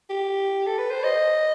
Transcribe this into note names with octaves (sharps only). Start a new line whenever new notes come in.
G4
A4
B4
C5
D#5